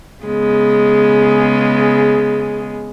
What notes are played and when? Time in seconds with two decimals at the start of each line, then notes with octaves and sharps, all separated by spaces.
0.24 C#3 G#3 B3